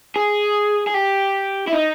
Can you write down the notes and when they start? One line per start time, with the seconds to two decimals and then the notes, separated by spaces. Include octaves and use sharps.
0.16 G#4
0.87 G#4
0.94 G4
1.67 E4
1.72 D#4